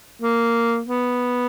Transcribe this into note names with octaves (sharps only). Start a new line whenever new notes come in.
A#3
B3